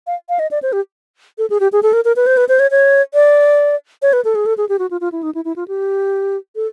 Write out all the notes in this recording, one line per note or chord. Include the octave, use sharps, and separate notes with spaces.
F5
F5
D#5
D5
C5
G4
A4
G#4
G4
G#4
A4
A#4
A#4
B4
C5
B4
C5
C#5
C#5
D5
C#5
B4
A4
G#4
A4
G#4
G4
F#4
F4
F4
E4
D#4
E4
E4
F4
G4
A4